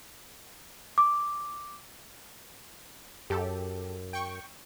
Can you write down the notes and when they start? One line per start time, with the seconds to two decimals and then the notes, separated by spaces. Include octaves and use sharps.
0.98 D6
3.30 F#2 G4 A4
4.13 G5 C#6